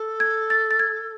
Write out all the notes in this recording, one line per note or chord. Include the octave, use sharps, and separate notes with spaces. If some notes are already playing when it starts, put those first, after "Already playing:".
Already playing: A4
G#6
A6
A6
G#6